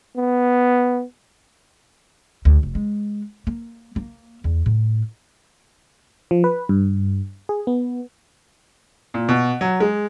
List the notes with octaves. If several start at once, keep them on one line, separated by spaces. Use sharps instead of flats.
B3
D2
F1
G#3
A#3
A#3
E2
A2
F3
B4
G2
G#4
B3
A#2
B2
F#3
G#3